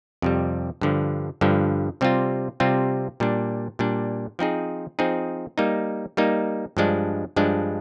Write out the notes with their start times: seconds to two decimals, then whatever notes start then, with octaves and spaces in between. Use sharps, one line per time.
0.22 F2 C3 G3
0.81 G2 D3 F3
1.41 G2 D3 F3
2.01 C3 G3 C4 F4
2.60 C3 G3 C4 F4
3.20 A#2 G3 D4
3.79 A#2 G3 D4
4.39 F3 C4 D#4 G#4
4.99 F3 C4 D#4 G#4
5.58 G3 A#3 D#4
6.17 G3 A#3 D#4
6.77 G2 F3 G#3 D4
7.36 G2 F3 G#3 D4